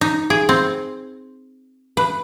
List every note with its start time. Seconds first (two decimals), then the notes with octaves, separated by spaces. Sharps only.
0.01 D#4
0.30 G#4
0.49 C4
1.97 B4